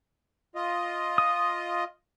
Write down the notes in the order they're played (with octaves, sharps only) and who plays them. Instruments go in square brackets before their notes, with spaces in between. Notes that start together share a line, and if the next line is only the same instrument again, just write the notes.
[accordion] F4 D#5
[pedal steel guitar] D#6